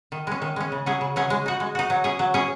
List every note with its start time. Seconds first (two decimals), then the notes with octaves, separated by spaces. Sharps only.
0.12 D#3
0.27 G#3 C#4
0.42 D#3
0.56 G#3 C#4
0.72 C#3
0.86 F#3 C#4 G#4
1.01 C#3
1.16 F#3 C#4 G#4
1.30 G#3
1.46 D#4 F#4
1.60 G#3
1.75 D#4 F#4
1.90 F#3
2.04 C#4 G#4
2.19 F#3
2.34 C#4 G#4